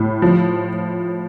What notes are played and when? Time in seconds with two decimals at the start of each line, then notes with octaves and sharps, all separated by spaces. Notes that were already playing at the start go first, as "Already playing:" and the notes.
Already playing: A2
0.22 F3